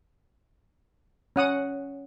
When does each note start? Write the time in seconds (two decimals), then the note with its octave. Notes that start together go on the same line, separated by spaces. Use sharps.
1.36 C#4 F#5 D#6